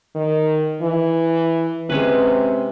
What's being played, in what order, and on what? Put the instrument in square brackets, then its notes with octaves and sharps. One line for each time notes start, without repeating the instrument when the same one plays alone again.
[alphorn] D#3
E3
[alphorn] C3 [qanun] G#3 C#4 B4